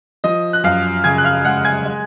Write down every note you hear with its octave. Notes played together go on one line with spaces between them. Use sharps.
F3 D#5 D#6
F#6
F#2 F5 F6
C#3 G#5 G#6
F#6
F5 F6
G#3 F#5 F#6
G#5 G#6
G#3